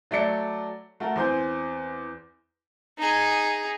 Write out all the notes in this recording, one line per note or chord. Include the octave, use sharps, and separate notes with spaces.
F#3 A3 D5 C#7
A3 F#4 A#4
E2 C4 C5 G#5 G6
D#4 G#4